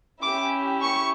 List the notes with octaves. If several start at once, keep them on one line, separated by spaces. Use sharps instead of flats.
C#4 E4 G4 D6
C#6